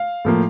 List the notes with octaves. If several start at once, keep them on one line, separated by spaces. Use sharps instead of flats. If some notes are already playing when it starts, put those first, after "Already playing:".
Already playing: F5
A2 F3 A#3